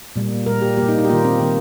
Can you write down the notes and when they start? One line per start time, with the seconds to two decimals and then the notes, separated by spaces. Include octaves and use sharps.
0.16 A#2 G3 A#3
0.46 A#2 G3 A#3 A#4
0.62 G4
0.77 A#2 G3 A#3 G4
0.89 D#4
0.99 D#4
1.05 G4
1.09 D#3 A#3 F4
1.25 C4
1.41 D#3 A#3